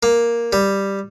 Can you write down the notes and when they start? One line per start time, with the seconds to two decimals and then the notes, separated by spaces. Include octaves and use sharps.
0.03 A#3
0.53 G3